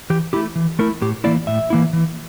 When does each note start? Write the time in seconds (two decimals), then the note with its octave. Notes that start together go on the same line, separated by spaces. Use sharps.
0.10 E3 G4
0.33 A3 E4 G4
0.56 E3
0.79 A3 E4 A#4
1.02 A2 G4
1.24 E3 A#3 E4 D5
1.47 A2 E5
1.70 E3 A#3 E4
1.93 E3